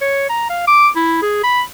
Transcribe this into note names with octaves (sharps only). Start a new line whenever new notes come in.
C#5
A#5
F5
D6
E4
G#4
B5